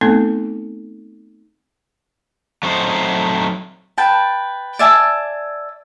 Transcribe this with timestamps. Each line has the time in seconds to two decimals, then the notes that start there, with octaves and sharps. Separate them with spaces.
0.01 A3 B3 C4 D#4 A4
2.63 F#3 A3 C4 D4 D#4 C5
3.98 B4 G5 A5
4.79 D5 E5 G#5 A5